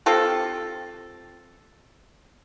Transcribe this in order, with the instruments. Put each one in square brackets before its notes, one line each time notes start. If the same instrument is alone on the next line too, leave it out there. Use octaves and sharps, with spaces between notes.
[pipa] C4 F4 G4 A4